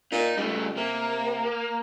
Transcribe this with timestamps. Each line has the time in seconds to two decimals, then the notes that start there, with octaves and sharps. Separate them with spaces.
0.12 A#2 D#4
0.37 C#2 G3 A3
0.77 C3 A#3